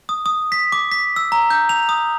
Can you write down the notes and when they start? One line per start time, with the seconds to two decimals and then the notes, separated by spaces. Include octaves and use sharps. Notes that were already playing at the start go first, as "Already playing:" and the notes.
0.09 D#6
0.26 D#6
0.52 B6
0.72 D6
0.92 B6
1.16 E6
1.32 A#5
1.50 G6
1.69 F7
1.89 D#6